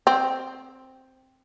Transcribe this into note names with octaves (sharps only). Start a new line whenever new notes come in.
C4